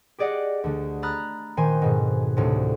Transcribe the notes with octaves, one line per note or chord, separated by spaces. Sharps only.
G4 G#4 D5 D#5 F#5
D2 D3
A#5 B5 D#6 F6 F#6 A6
A#2 D#3 C5 G#5 C6
F2 G#2 B2
D2 A2 C3